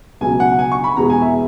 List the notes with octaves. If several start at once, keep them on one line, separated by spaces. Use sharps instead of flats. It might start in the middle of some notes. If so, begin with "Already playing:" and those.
C#2 B2 F#3 G#5
F#5
G#5
C#6
B5
E2 B2 G#3 A#5
G#5
E5